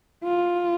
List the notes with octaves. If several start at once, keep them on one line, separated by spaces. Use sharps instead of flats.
F4